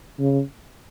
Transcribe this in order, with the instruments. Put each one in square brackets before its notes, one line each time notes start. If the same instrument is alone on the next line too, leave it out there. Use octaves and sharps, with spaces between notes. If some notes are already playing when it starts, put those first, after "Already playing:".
[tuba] C#3